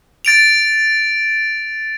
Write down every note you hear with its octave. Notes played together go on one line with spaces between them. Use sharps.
A6 D7 F7